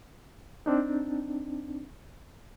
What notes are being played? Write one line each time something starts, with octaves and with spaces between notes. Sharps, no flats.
C4 D4 D#4